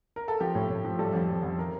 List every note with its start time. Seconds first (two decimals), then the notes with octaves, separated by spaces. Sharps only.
0.16 A#4
0.28 A4
0.40 F3 G4
0.55 A2
0.69 A2
0.85 F3
0.99 G3 A4
1.13 F2
1.29 G3
1.43 F2
1.59 A#4